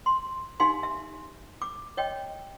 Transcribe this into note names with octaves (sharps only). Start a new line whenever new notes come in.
C6
D#4 G4 F5 G#5 C6
E5
D6
C#5 D#5 G5